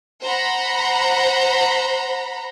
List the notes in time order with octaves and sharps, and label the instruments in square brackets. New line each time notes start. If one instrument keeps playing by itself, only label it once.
[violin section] C5 F#5 A#5 B5